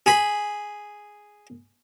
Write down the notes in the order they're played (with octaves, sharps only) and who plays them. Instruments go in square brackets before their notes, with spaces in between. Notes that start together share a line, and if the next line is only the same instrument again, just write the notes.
[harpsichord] G#4 B5